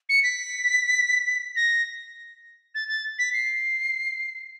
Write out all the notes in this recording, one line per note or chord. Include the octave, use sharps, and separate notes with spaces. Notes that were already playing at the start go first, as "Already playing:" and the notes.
C#7
B6
A#6
A6
A6
B6
C7